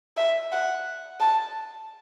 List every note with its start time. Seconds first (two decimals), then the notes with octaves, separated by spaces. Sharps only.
0.17 E5
0.52 F#5
1.20 A5